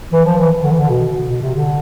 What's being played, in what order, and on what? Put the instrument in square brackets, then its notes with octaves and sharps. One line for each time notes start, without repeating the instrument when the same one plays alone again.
[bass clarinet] E3
F3
E3
E3
D3
E3
D3
B2
B2
C3
D3